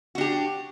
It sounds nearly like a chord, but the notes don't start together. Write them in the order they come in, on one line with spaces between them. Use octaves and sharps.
F#4 D4 G4